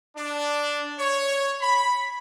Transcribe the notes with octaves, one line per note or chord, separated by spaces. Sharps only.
D4
C#5
B5